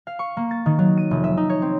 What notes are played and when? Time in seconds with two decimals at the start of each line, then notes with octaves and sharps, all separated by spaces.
0.07 F5
0.19 C#6
0.37 A#3
0.51 A6
0.66 D#3
0.79 F#3
0.97 D#7
1.11 F1
1.24 E5
1.37 D#4
1.49 C#5
1.62 C4